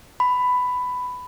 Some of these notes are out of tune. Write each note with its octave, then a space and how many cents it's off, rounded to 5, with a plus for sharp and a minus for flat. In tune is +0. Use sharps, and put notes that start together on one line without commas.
B5 +15